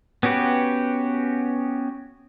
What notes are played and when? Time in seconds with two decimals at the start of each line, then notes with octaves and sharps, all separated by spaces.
0.23 B3 C#4 F#4 G4 B4